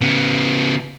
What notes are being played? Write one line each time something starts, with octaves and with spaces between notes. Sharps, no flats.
C#3 B3